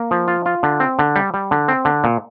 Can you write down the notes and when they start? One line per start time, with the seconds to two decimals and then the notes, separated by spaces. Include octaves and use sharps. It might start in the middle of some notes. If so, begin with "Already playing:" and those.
Already playing: A#3
0.11 F3
0.28 F4
0.46 F4
0.63 D3
0.80 C4
0.99 D3
1.16 G3
1.34 G3
1.51 D3
1.68 C4
1.85 D3
2.04 A#2